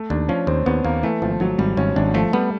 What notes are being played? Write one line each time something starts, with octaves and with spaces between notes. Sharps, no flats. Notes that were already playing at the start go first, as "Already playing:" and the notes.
Already playing: A3
D#2 D4
F3 C#4
D#2 C4
D#2 B3
D#2 A#3
E3 A3
G#1 F3
G#1 F#3
G#1 G3
G#1 C#4
G#1 D4
F3 A3
G3 B3